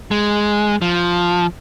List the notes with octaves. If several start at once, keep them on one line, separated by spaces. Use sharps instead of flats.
G#3
F3